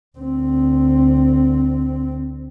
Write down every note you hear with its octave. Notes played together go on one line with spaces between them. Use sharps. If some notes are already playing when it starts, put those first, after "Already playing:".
D2 C4